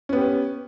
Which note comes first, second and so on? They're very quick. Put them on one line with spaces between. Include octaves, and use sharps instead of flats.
C#4 B3 G4